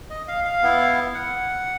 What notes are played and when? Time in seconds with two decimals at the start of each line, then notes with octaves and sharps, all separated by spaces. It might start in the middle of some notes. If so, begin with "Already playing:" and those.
0.10 D#5
0.28 F5
0.45 F5
0.63 B3 E4
1.14 F#5